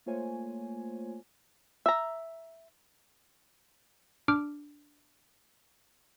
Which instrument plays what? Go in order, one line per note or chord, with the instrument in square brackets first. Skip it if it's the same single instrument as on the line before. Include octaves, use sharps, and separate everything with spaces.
[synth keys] A3 A#3 F4 C5 C#5 G#5
[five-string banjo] E5 A#5
[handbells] D4 D6 F6 D7